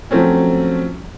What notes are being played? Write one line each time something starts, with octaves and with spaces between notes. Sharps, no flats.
F3 F#3 A3 C4 C#4